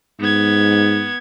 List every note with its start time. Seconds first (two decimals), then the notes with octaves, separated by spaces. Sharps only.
0.20 G#2 B3 G#6